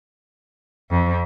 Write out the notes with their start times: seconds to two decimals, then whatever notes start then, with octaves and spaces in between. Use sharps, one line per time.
0.90 F2